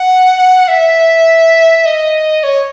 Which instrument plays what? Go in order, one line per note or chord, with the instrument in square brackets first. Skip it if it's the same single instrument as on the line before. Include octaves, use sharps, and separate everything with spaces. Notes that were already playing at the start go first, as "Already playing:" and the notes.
Already playing: [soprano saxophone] F#5
E5
D#5
C#5